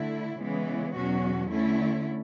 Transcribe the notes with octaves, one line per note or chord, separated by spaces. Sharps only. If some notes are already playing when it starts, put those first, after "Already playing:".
Already playing: D3 A3 E4
C#3 E3 G#3 B3
E2 B2 F#3 C#4 F#4
D3 A3 C#4 E4